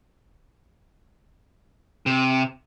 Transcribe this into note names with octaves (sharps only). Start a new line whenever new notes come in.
C3